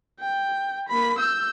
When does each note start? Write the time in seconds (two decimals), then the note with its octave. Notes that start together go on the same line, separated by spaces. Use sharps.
0.20 G5
0.88 A#3 B5
1.18 E6 G6